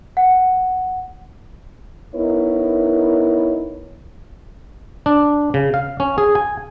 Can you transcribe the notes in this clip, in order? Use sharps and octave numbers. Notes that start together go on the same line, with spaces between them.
F#5
B3 D#4 E4 A#4 C#5
D4
C#3
F5
C#4
G#4
G#5